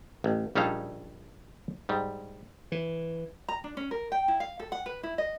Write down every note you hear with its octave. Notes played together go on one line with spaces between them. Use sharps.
A1
A#1 G3 C#4 D#4 A4 F5
G#2 G3
E3
A#5
D4
C#4
A#4
G5
E4
F5
A4
F#5
B4
E4
D#5